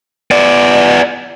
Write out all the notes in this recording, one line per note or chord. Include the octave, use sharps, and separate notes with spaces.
B3 D5